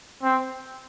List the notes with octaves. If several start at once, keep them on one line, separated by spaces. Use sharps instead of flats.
C4